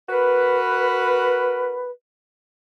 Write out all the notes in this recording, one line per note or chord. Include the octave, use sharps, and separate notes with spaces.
F#4 A#4 B4